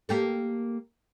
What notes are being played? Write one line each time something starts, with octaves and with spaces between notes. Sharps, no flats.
A#3 G4 A4